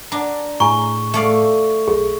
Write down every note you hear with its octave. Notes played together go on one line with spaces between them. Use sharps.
D4 D5 A5 A#5
A2 G#4 G#5 A#5 C#6
A3 D5 F5
B1 G#4